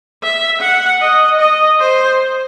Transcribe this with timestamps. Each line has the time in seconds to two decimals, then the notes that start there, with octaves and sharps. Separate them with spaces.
0.22 E5
0.61 F#5
1.01 D#5
1.40 D#5
1.80 C5